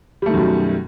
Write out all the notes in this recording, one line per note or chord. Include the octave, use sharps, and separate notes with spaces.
F#2 B2 D#3 G3 A3